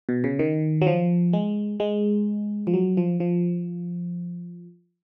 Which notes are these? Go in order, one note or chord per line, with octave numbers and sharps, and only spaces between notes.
B2
C#3
D#3
F#3
F3
G#3
G#3
F3
F#3
F3
F3